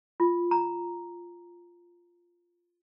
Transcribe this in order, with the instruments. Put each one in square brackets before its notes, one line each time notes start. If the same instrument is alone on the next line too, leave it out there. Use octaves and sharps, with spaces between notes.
[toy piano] F4
A#5